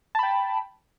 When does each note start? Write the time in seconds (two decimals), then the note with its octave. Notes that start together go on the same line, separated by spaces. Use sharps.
0.15 A5
0.19 B5
0.23 G5